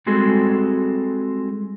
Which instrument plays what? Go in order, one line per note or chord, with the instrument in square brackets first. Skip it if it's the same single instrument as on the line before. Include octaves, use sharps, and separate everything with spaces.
[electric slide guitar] G3 G#3 C4 F#4 G#4 A4